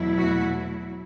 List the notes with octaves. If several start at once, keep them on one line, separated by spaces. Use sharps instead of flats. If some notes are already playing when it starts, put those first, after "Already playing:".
Already playing: E2 B2 F#3 A3 E4
F#4